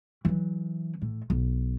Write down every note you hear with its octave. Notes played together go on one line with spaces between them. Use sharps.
E3 F#3
A2
B1